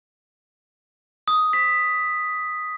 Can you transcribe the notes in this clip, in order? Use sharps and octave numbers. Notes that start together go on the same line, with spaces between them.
D#6
B6